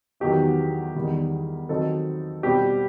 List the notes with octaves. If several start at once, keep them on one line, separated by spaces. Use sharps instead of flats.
E2 D#3 F#3 B3 D#4 G4
E2 D#3 G3
D#3 F#3 C4 D#4 A4
B2 G3 C4 G4